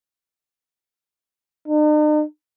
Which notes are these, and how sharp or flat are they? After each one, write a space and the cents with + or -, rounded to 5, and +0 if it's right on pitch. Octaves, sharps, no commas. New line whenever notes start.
D#4 -45